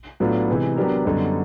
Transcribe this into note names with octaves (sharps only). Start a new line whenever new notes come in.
A2 F#3 B3 D4 F4
C3 E3 G#3
F#3 B3 D4 G4 A#4
F#2 D3 G3 B3 D#4